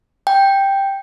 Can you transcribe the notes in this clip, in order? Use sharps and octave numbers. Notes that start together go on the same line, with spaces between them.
G5